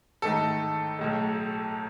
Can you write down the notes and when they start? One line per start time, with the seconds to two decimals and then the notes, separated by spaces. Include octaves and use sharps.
0.22 A1 G#2 D#3 A3 A4
0.99 B1 A2 G#3